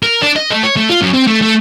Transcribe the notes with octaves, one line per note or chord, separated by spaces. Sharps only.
A#4
D4
D#5
A3
C#5
A3
F4
F#2
C4
A3
A3